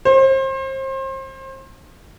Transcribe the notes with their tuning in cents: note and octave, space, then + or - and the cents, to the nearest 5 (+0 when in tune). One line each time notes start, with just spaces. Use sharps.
C5 +35